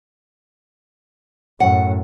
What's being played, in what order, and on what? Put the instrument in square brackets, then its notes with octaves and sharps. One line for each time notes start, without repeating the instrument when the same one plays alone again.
[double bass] F#2 A2 [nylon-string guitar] F#5